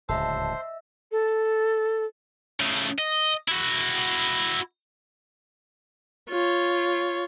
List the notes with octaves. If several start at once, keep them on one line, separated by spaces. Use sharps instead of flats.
D1 C#2 C5 D#5 E5 A5 E6
A4
C#3 A3
D#5
E4 F#4
F4 C#5